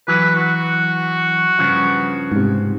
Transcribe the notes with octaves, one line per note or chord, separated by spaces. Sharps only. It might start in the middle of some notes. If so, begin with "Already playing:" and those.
E3 F#3 B4
F#4
G2 C#3 F3
G#2 C3